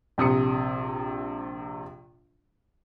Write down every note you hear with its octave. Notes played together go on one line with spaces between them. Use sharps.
A#1 C3 D#6 C#7